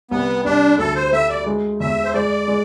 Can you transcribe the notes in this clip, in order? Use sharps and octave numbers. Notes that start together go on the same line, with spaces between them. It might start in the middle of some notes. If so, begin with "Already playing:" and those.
C2 B3
C2 D4
D2 A4
C5
A3 E5
D5
G#3
E2 E5
C5
G#3 D5
G#3